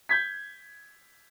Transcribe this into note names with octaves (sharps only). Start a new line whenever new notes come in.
G6 G#6 B6